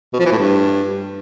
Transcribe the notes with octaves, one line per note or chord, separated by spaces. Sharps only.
B2
F3
E3
A2
G2